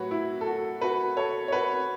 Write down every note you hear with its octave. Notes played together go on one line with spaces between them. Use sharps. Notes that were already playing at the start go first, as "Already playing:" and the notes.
Already playing: A2 F#3 F#4 B4 C#5
E4
A4
F#4
F#4 B4
A4 C#5
C#5
F#4 B4